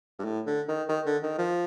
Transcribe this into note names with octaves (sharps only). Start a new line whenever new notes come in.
G2
A2
D3
D#3
D#3
D3
D#3
F3